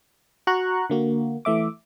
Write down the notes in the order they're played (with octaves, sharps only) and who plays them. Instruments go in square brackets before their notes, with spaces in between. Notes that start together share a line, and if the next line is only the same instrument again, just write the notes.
[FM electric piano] F#4 A#5 C#6 F#6
D3 A#3 F#4
E3 A3 E5 D6